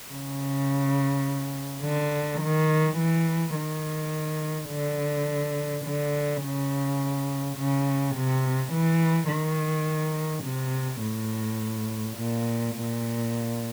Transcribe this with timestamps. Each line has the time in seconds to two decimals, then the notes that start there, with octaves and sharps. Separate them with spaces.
0.12 C#3
1.83 D3
2.41 D#3
2.98 E3
3.55 D#3
4.70 D3
5.85 D3
6.43 C#3
7.58 C#3
8.16 C3
8.73 E3
9.30 D#3
10.45 C3
11.02 A2
12.17 A#2
12.75 A#2